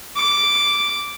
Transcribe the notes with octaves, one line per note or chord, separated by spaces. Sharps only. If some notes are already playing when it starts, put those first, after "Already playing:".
D6